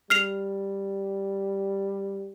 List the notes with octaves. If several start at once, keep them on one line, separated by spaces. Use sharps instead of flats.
G3 F6 C7 F7